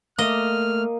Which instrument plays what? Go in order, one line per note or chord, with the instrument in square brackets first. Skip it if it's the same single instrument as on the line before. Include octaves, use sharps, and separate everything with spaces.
[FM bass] A3 [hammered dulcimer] A#3 [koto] D#5 [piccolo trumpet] F6